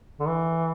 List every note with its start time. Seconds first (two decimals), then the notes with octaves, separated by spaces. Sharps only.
0.20 D3
0.27 E3